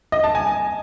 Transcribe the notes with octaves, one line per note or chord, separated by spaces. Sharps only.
D#5
A5
G#5